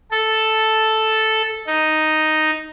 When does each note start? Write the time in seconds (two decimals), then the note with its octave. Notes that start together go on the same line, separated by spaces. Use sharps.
0.11 A4
1.66 D#4